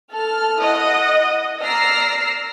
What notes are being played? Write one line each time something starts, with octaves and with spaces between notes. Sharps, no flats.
A4 F6
E4 D#5 F#5 D#6
D5 A#5 E6 F6 A#6 C7